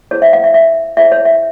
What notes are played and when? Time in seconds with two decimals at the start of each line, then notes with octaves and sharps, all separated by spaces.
0.11 E4 G#4 C5 C#5
0.22 E5
0.33 F5
0.44 E5
0.54 E5
0.97 E4 G#4 C5 E5
1.12 C#5
1.25 E5